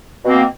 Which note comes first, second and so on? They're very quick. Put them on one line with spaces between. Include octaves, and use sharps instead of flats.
B2 C4 A#3